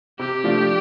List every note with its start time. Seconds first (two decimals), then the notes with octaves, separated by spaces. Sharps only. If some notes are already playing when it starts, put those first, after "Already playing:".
0.19 C3 G4
0.44 F3 A3 D4 F4